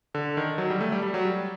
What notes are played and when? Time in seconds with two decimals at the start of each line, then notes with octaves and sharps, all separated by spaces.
0.14 D3
0.37 D#3
0.58 F#3
0.70 G3
0.81 A3
0.92 G3
1.03 G3
1.14 F#3
1.25 G3